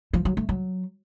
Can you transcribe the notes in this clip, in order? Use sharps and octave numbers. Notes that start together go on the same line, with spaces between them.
F3
F#3
A3
F#3